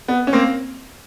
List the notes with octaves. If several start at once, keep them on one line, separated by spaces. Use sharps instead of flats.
B3
C#4
A#3 C4